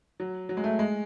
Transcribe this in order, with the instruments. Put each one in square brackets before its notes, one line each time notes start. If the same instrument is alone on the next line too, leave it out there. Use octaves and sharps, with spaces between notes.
[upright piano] F#3
F#3
G#3
A3
G#3